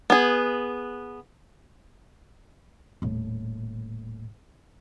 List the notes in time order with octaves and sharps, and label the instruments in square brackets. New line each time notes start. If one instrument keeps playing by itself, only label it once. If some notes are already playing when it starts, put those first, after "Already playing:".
[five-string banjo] B3 G#4
[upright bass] D#1 A2